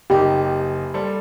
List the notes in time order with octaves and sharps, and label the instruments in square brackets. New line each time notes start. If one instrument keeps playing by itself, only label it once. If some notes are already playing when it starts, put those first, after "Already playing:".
[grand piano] F#1 D#4 [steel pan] G4
[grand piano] G3 A4 C5